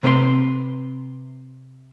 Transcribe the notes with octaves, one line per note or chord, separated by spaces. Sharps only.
C3 C4 B4 C5 C6